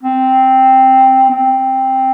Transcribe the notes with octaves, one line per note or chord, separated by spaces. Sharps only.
C4
C4